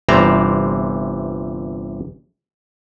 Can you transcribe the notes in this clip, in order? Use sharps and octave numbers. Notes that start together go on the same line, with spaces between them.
G1 C3 E3 C5 D5 A#5